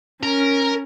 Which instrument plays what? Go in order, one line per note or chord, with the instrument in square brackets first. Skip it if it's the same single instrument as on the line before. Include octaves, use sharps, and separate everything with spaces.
[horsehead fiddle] C#4 [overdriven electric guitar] A#4